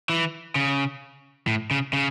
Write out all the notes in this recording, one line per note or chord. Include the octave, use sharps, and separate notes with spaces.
E3
C#3
A2
C#3
C#3